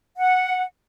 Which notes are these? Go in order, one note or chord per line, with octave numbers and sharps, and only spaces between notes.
F#5